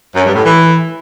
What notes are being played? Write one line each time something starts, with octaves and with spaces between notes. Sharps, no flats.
F#2
G2
A2
E3